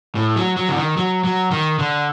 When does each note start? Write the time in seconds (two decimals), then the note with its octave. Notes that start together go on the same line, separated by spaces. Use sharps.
0.15 A2
0.36 F#3
0.57 F#3
0.69 D3
0.77 D#3
0.97 F#3
1.24 F#3
1.51 D#3
1.79 D3